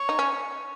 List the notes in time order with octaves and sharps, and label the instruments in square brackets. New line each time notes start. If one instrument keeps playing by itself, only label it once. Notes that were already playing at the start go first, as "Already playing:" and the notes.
Already playing: [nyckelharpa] C#5
[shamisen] D#4
C#4